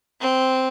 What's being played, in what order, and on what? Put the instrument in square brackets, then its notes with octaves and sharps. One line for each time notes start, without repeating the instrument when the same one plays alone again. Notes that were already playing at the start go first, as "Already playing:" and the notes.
[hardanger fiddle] C4